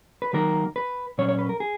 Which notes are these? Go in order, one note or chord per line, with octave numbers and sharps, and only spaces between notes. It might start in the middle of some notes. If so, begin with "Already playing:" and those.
B4
D#3 F#3 A#3 A#4
B4
A#2 F#3 C#4 C#5
C#5
B4
A#4
G#4